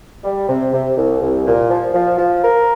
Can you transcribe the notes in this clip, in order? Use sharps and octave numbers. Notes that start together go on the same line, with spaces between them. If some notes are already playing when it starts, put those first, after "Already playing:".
G3
C3
C3
C2
C2
A#2
F3
F3
F3
A#4